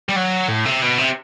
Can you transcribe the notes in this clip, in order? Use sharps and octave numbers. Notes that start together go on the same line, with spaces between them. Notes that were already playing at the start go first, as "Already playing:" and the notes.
G3
F#3
A2
C3
B2
C3